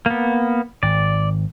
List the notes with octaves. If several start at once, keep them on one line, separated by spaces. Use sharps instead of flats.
A#3 B3
G#1 D5